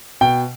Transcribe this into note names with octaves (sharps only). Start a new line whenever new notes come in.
B2 G5